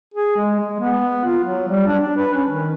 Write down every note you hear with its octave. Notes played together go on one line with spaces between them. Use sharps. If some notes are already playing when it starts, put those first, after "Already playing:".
G#4
G#3
G#3
B3
F4
F#3
G3
D4
D4
B4
C#4
D#3